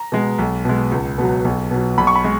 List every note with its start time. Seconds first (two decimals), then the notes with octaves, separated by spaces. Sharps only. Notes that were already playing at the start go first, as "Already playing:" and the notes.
Already playing: A#5
0.12 B2 G#3
0.39 B1
0.65 B2 G#3
0.92 C#2
1.18 B2 F#3
1.45 B1
1.71 B2 F#3
1.98 B1 B5
2.07 C#6
2.16 B5
2.24 G#3